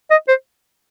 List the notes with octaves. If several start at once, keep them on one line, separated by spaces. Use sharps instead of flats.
D#5
C5